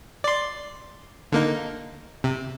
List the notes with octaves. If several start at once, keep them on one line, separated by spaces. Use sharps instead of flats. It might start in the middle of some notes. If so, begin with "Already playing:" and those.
D5 C6
D3 A#3 D#4
C3